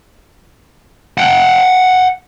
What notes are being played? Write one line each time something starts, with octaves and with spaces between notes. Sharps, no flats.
F#5 G5